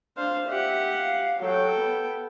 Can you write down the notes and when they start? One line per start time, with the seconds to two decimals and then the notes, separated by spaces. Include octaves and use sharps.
0.17 D4 C5 F5
0.48 G4 E5 F#5
0.92 F5
1.40 F#3 A4 G5
1.80 B3